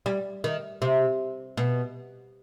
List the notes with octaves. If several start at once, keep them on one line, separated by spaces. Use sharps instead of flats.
G3
D#3
C3
B2